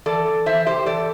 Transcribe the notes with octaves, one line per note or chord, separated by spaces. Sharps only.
E3 A4 D5
E3
E3 C5 E5
C3 G4 C5
E3 A4 D5